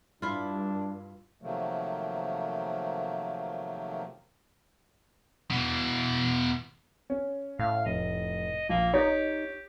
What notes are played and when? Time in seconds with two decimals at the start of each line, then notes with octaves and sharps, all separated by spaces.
0.22 G2 D4 E4 F4
1.42 C3 D#3 F3 F#3 A3 A#3
5.51 B2 E3
7.10 C#4
7.59 A2 F5
7.86 F1 D#5
8.69 A#1 A#3
8.94 D#4 G4 C#5